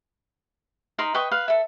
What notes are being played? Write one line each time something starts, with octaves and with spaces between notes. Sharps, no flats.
D#4 A#4 B5 C6
B4 D#5 G5 C#6
B4 F5
A4 E5